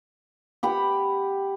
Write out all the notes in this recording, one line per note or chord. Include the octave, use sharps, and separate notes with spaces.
G4 F#5 B5